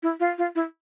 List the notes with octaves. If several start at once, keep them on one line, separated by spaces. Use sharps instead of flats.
E4
F4
F4
E4